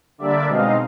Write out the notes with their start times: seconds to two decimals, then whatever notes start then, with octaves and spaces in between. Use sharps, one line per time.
0.18 D3 G3 A#3 D4 D5 E5
0.47 B2 G#3 C4 D#4 D#5 F5